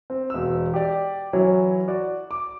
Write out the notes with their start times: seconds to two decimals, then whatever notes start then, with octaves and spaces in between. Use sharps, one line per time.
0.10 C4
0.30 E1 E6
0.74 G4 D5
1.33 E3 F#3 C#4 E4
1.88 F#4 D5
2.31 D6